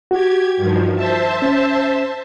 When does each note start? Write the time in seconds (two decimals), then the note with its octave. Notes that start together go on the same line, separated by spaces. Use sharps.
0.11 F#4 G4 G#6
0.56 G2 D#3 F3
0.95 C5 E5 A5
1.42 C#4